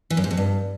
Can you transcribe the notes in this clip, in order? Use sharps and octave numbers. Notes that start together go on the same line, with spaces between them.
E3
F#2
G#2
F2
G2